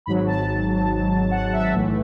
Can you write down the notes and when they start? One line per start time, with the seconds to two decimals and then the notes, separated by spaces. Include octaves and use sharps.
0.06 G#1 G#2 F#3 B5
0.27 A5
1.31 F#5
1.53 E5
1.73 B1 A2 E3 A3